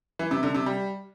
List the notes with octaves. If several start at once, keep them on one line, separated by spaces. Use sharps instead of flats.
E3
C3
D3
C3
G3